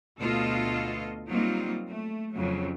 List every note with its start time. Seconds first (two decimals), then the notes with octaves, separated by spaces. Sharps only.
0.19 D2 B2 F4 A4 D#5
1.30 F#3 G3 A#3 C4 D#4 F4
1.89 A3
2.34 F2 C#3 F#3